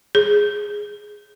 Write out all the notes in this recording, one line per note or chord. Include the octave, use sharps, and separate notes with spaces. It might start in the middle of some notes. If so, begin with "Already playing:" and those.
G#4